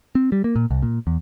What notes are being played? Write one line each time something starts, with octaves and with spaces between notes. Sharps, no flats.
C4
G3
A#3
A#2
C2
A#2
E2